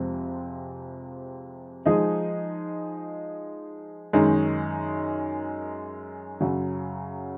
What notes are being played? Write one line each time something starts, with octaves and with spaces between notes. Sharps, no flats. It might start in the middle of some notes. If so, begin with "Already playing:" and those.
Already playing: F2 C3 F3 G#3 C4
F3 G#3 D#4 G#4 D#5
F#2 D#3 G#3 D#4
F#2 C#3 F#3